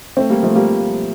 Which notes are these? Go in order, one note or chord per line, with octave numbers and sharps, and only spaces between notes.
A3 C4
G3 A#3
F3 A3
G3 A#3